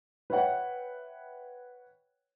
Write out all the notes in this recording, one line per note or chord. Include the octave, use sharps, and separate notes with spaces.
B4 C#5 E5 F#5 G5